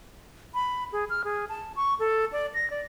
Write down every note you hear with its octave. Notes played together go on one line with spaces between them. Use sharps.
B5
G#4
F6
G#4
A5
C#6
A4
D5
A#6
D5